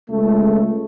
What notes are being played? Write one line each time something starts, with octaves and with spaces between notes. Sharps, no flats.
C#2 A3